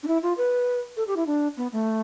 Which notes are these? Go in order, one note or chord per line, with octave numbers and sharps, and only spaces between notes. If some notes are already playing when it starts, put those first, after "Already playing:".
D4
E4
F4
B4
A4
G4
E4
D4
B3
A3